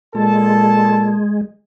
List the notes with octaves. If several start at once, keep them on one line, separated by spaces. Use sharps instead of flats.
A#2 G#3 A4 A5